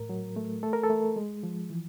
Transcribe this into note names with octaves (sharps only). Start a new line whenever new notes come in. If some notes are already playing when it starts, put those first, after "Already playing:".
Already playing: A2 A#4
F#3
A3
A3 A4
A#4
A4
A3
G#3
F3
E3